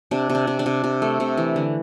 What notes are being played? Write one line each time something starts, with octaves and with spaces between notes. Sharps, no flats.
C3 D4
C3
D4
C3
D4
C3
C3
A3
C3
E3
D3